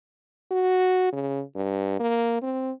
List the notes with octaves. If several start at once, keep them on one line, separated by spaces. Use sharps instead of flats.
F#4
C#3
G2
A#3
C4